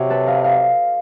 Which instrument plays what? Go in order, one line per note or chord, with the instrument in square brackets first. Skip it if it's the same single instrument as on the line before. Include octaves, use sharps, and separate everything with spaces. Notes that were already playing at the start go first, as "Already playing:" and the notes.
Already playing: [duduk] C3 [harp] F#4 C#5
[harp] A4 B4
D#5 F5
D#5 F5